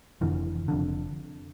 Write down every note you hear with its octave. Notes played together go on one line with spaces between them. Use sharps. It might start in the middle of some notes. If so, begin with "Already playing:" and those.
F1 F2 D3 E3
F1 F2 D3